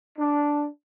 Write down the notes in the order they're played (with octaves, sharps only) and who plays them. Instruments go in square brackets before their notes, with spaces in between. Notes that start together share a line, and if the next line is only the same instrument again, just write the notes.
[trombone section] D4